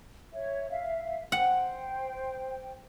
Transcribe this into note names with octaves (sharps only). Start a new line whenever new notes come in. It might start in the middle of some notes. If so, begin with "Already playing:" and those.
C#5 E5
E5 F5
C5 F#5 G5